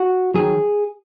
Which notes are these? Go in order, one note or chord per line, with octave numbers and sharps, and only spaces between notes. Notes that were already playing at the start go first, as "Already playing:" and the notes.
Already playing: F#4
D#3 F#3 G#4